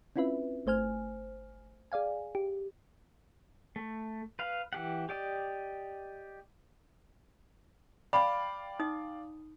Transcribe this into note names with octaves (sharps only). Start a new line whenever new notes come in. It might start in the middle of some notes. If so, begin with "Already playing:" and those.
C4 C#4 E4 F4 B4 E5
G1 A3 C5 G#5 F6
G#4 D5 F5 G#5
G4
A3
B4 F5
E3 G4 F#5
G4 D5 D#5
D5 F5 G5 B5 D6
D#4 D#6